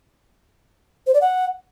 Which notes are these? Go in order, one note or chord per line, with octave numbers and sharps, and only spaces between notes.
C5
D5
F#5